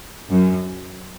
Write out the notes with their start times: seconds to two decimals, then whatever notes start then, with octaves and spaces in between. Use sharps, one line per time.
0.30 F#2